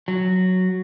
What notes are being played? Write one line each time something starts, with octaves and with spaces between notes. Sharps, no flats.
F#3